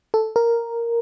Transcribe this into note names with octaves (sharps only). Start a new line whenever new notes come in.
A4
A#4